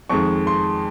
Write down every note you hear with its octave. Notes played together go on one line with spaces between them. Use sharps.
F2 D#3 G#3 C#6
C6